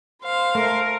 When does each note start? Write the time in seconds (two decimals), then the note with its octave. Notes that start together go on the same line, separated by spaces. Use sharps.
0.22 C5 F5
0.55 A3 A#4